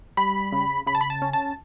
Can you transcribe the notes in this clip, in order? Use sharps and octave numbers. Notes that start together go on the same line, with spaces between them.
G3 B5
C#3
C#3 B5
A5
B5
A5
C#4
A5